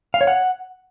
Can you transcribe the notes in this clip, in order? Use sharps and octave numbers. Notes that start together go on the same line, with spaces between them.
F5
C#5
F#5